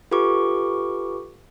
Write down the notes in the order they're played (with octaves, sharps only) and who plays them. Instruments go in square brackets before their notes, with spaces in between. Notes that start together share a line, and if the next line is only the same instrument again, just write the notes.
[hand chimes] F4 G4 A4 B4 C#6 D6